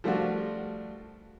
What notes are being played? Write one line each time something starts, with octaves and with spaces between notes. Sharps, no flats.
F3 G3 A3 D4 F4 F#4